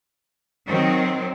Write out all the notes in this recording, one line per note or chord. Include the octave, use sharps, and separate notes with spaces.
D#3 F#3 C4